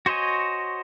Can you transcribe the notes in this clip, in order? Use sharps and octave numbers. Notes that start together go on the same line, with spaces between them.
F#4 C5 C#5 D#5 G#5